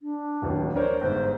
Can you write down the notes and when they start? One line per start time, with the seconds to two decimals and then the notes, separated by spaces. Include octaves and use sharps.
0.01 D4
0.42 D1 A1 D#2
0.76 D4 A#4 C5 C#5
1.01 G1 G#2 C5